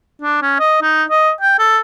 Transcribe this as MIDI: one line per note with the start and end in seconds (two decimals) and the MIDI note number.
0.22 0.40 62
0.42 0.57 61
0.59 0.80 75
0.82 1.04 63
1.10 1.32 75
1.41 1.57 79
1.59 1.80 69